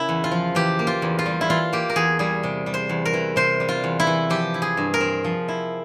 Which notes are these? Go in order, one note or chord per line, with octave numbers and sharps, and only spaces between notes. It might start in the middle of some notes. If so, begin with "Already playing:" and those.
Already playing: C#3 E4 A#4
E2
F4
F3
E3 G4
A#3
F4
E2
F4
G3
E4
E3 F4
A#3 G4
A#4
E2 G#4
G3 G#4
C3
G3
C5
E2
A#4
E3
C3 C5
G3
F4
E2
E4
E3
F3 G4
E4
G#4
G2
A#4
C4
F3
E4